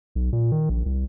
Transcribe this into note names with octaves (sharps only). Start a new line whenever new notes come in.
B1
A#2
D#3
A#1
C2